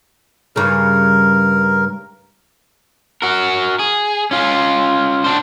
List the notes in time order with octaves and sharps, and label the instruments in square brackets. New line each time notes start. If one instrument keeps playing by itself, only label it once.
[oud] G2 C#3 [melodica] A#4
[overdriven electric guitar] F#4 A#4
G#4
C#4 F4
D4 C5